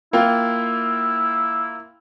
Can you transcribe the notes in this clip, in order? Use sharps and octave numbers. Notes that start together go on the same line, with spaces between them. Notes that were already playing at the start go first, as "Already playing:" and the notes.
A#3 E4 F4 G5